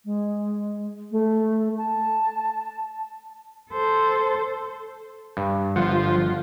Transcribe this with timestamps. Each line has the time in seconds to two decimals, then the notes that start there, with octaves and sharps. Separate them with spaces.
0.05 G#3
1.11 A3
1.78 A5
3.71 A4 C5
5.37 G2
5.76 G1 F3 F#5